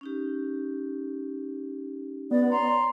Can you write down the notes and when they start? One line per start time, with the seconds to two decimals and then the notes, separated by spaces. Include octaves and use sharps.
0.01 C#4 D#4 G4
2.31 B3 D5
2.52 C#5 A#5 C6